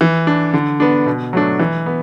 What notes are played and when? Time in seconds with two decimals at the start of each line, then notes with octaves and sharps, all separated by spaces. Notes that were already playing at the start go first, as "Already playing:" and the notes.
0.01 E3
0.27 D4
0.54 D3
0.80 B3 D4
1.06 B2
1.33 F#3 A3 D4
1.60 E3
1.86 B3